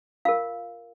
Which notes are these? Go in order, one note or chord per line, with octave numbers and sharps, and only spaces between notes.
F4 A#4 F5